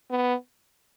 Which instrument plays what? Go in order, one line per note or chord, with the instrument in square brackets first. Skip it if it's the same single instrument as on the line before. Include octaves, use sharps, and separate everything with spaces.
[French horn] B3